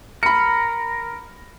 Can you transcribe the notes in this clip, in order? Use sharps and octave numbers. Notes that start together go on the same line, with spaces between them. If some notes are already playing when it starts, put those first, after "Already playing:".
A#4 B5 C#7